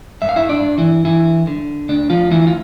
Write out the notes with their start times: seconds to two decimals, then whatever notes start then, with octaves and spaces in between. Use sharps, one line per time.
0.22 G2 E5
0.29 F5
0.36 E4 E5
0.49 D4 D5
0.63 G2
0.78 E3 E4
1.05 G2 E3 E4
1.47 D3
1.89 D2 D4
2.10 F3 F4
2.31 D2 E3 E4
2.47 F4